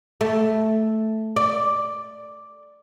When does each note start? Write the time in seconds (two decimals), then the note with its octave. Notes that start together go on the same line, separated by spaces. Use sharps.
0.21 A3
1.36 D5